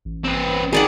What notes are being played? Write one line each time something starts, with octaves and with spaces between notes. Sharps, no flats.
A1
C4 B4
D#3 G#4 D5 F#5